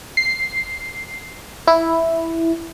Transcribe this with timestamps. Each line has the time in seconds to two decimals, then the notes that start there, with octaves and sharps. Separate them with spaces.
0.17 C7
1.67 E4